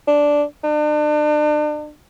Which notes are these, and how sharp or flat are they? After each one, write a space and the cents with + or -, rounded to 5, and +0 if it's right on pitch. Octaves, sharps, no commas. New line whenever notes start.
D4 -5
D4 +40